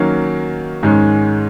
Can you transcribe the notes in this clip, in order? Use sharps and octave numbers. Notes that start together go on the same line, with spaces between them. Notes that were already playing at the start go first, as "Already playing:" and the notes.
Already playing: D#3 F#3 A#3 C#4
G#2 D#3 G#3 C#4